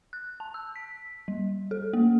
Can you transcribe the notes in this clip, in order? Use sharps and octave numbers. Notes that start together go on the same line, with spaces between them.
F#6
A5
E6
B6
G3
A4
A#3